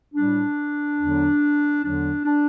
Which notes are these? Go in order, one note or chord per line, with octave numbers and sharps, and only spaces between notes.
A2 G3 D4
E2 D3 F#3
E2 D3 F#3 D4
D4